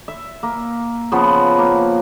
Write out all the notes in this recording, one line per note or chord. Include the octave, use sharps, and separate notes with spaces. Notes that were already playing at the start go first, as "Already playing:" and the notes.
E5
A#3
C#3 F3 B3
A#3